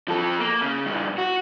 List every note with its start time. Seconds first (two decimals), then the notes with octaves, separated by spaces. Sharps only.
0.08 F3 A4
0.40 A#3
0.62 C#3
0.87 G2 A#2
1.18 F#4